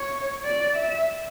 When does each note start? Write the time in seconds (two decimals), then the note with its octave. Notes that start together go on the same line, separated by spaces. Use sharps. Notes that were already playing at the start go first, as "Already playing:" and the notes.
Already playing: C#5
0.45 D5
0.77 E5